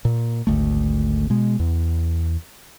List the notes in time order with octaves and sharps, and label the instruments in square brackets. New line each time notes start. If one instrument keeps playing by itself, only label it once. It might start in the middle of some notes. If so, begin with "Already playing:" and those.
[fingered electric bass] A#2
G#1 D2 A3
B2 G#3
E2